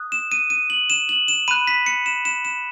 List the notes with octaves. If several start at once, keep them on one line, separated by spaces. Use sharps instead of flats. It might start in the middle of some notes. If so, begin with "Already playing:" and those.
Already playing: D#6 F#6
E7
D#7
D#7
F#7
E7
F#7
E7
B5 F#6 D#7
B6
C#7
E7
E7
E7